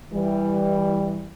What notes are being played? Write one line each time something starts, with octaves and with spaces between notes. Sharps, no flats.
E3 G3